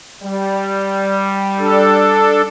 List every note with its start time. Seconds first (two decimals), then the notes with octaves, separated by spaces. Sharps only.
0.23 G3
1.59 D4 A4